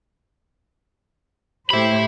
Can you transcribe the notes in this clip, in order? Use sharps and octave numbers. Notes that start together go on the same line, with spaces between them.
A2 G4 C5 E5 B5